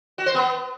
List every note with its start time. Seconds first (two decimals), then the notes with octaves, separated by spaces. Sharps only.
0.18 F#4
0.26 C5
0.34 B3